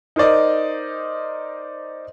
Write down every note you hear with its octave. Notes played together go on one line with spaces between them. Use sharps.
D#4 A#4 C5 D5 D#5